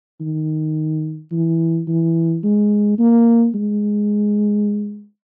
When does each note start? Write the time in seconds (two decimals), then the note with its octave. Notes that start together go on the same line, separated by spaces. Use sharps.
0.21 D#3
1.32 E3
1.88 E3
2.44 G#3
2.99 A#3
3.55 G#3